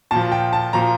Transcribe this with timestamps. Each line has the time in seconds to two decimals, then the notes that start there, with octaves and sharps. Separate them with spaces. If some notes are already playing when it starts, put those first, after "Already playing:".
0.11 A#2 F3 A5
0.32 G5
0.53 A5
0.73 A#2 F3 A#5